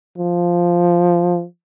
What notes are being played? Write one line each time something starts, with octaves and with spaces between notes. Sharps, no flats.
F3